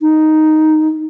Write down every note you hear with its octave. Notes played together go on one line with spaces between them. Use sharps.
D#4